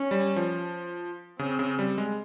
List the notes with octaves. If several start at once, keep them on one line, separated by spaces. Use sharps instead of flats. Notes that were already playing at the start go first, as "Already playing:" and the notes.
Already playing: C#4
G3
F3
C#3 C4
C#3
G3
G#3